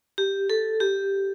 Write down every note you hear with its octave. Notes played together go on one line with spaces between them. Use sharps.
G4
A4
G4